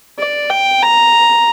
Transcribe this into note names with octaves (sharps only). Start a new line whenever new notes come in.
D5
G5
A#5